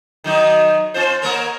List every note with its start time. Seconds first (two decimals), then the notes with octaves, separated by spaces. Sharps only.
0.24 D#3 F#3 D#4
0.94 C4 F4 C5
1.22 A#3 A#4 C#5